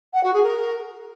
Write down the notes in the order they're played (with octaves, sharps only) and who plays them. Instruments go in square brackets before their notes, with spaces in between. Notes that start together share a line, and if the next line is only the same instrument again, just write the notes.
[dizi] F#5
F#4
G#4
A#4